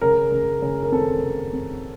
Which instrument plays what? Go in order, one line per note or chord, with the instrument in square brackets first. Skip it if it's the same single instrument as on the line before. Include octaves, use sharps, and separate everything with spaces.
[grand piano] C#3 A#4
C#3
C#3
A#4
C4 A4
C#3
C4